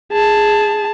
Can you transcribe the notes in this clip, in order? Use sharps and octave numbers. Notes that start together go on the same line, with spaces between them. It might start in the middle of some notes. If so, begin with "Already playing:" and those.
G#4 A5